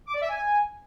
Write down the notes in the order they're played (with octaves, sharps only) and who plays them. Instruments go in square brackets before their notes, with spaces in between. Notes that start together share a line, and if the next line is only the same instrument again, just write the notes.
[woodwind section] D6
D5
E5
G#5